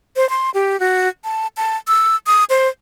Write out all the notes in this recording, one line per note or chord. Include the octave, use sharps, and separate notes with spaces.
C5
C6
G4
F#4
A5
A5
E6
D#6
C5